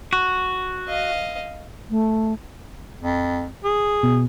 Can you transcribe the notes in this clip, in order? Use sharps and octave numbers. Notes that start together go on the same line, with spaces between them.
F#4
D#5 F5
A3
F2
G#4
B2